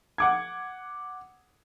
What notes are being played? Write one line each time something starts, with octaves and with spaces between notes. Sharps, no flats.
F#5 D6 G#6